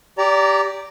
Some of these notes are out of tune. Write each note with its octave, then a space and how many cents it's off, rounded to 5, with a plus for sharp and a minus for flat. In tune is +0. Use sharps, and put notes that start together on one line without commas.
G4 +0 D5 -25 A#5 -10